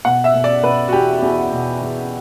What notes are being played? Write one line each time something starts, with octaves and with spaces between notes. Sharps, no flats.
B2 F#5
E5
B2
D5
B2 B4
F#4
E2 G4
E2 F#4
B2
E2